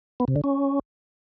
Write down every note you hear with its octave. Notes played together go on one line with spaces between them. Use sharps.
B3
C3
D3
C#4